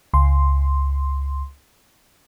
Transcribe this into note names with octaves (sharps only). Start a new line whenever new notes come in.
C#2 C6